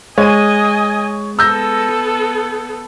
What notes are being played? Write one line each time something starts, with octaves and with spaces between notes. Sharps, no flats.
G#3 C#5 D#5 G#5 D#7
B3 A4 E6 G6 A#6